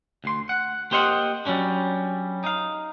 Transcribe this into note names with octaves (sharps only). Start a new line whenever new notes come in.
D2 C6
F#5
A#3 G4 C5 D#5 F5 F#5
F#3 G3 C#4 D4
D#4 F5